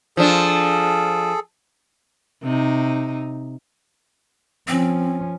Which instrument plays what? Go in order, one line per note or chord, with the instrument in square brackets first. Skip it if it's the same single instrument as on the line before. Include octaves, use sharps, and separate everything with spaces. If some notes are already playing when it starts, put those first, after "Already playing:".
[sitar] F3 D4 [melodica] G#4 A4
[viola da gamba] C3 D#4
[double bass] F3 C#4 [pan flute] C4